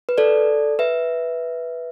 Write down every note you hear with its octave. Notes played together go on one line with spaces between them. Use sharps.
B4
A4 D5
B4 E5